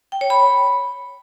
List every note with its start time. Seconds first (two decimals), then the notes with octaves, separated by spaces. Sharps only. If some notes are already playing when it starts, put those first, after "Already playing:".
0.12 G5
0.21 C#5
0.30 B5